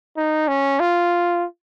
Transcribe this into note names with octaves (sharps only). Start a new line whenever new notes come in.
D#4
C#4
F4